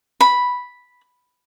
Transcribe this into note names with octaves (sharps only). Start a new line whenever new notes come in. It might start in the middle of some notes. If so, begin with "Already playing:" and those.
B5